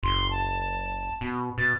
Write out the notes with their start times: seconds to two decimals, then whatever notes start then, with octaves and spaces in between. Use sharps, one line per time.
0.03 F#1 C6
0.30 A5
1.21 B2
1.58 B2 A6